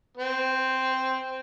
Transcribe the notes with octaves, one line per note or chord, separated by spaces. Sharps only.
C4